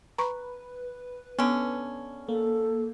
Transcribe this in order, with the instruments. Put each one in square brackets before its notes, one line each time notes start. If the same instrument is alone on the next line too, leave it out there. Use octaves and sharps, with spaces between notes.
[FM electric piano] B4 [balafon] A#5 C#6
[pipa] D3 C#4 [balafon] B3
[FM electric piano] A#3 [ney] A4